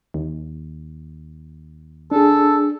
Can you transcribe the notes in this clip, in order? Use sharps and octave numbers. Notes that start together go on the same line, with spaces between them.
D#2
D4 G#4 A4